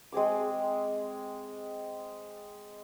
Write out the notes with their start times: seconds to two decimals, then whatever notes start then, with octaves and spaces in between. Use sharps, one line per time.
0.12 G#3 C4 G#4 D6